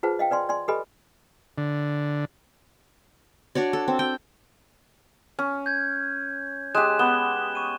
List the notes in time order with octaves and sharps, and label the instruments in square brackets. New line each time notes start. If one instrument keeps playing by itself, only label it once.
[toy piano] F4 G#4 B4 C5 F#5 A5
D#5 F5 G5
B4 D5 G#5 C6
D5 G#5 C6
G4 A4 B4 D#5 G#5 B5
[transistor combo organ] D3
[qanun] D4 F#4 C#5 D5
A4
C4
G5
[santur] C#4
[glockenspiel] G6 G#6
[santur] G#3 G4 [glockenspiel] G#5 F#6 E7
[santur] B3 [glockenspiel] E7 G7
[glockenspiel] C#6 D#7